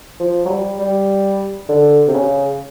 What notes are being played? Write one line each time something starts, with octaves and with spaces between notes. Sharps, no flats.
F3
F#3
G3
G3
D3
C3
C#3